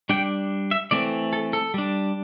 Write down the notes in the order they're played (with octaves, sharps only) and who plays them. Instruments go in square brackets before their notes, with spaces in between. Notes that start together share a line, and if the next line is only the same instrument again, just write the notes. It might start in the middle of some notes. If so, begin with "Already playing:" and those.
[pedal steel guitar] G3 D4 G5
E5
E3 A3 C4 D5
A4
A4
G3 D4